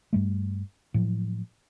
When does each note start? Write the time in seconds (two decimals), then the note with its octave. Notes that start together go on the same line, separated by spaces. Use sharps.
0.13 G2 G3 A3
0.94 A2 F3 F#3